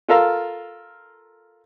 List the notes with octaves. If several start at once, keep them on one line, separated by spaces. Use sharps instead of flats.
F4 A4 A#4 F5